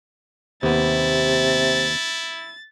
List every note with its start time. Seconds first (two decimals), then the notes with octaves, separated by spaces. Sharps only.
0.63 D#2 C3 B3 E4 A6